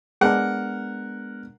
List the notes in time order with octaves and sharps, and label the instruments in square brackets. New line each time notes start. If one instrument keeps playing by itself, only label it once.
[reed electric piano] G#3 B3 D4 [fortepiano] A#4 F#5